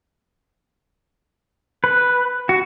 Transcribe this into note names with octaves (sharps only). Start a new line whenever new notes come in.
B4
F#4